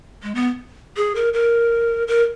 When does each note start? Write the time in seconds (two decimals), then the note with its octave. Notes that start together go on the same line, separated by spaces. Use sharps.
0.23 G#3
0.35 B3
0.97 G#4
1.15 A#4
1.33 A#4
2.08 A#4